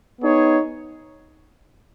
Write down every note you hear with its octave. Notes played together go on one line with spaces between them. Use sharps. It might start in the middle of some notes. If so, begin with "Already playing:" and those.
B3 D#4 G#4 C#5